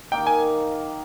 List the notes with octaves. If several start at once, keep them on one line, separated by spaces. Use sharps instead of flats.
D#3 A#3 D#4 G5
G#5